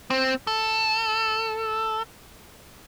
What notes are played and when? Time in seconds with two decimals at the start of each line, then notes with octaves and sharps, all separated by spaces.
0.10 C4
0.47 A4